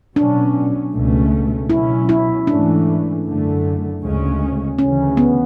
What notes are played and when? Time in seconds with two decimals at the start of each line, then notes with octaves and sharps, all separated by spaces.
0.16 B2 F#3 C#4 D4
0.93 C#2 B2 A3 C#4
1.70 B2 F#3 C#4 E4
2.09 E4
2.47 G#2 E3 A3 C#4 D4
3.24 F#2 D3 A3
4.01 D2 C#3 G#3 C#4
4.78 D2 C#3 E3 C#4
5.17 B3